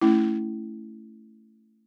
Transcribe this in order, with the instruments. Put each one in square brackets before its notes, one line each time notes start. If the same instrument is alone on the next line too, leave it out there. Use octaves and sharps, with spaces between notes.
[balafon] A3 C#4 E4